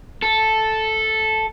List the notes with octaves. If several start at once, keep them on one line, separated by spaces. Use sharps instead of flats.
A4